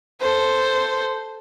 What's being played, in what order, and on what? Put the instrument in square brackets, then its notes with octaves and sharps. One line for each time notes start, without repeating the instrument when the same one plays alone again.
[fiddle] A4 C5